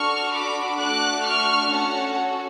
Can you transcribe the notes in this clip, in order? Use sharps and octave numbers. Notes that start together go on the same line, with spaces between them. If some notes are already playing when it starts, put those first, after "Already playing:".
Already playing: D4 F#4 A4 C#6 F6
B5 D6
A3 D4 F#4 A4 D6 F#6
C#6 F6
C#4 F#4 A4 F#5 A5